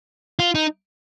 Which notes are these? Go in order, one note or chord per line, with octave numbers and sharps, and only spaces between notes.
F4
D#4